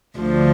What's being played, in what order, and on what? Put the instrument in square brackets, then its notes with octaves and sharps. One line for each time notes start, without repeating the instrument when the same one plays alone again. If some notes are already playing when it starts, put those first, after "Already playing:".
[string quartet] D2 D3 F3